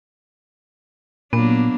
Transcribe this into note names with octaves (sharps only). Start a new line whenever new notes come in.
A#2 F#3 A#3 B3 D4